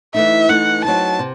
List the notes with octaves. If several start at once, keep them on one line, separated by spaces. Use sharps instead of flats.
E3 A3 D#4 E5
E3 A3 D#4 F#5
F#3 C4 D#4 A5
C3